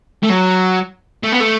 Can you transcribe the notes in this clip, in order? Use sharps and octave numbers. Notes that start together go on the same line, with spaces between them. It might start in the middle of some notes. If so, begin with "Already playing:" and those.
A3
F#3
A3
B3
A3